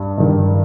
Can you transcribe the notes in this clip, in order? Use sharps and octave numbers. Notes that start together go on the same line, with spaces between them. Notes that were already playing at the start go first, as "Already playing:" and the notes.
Already playing: G2
G2 D#3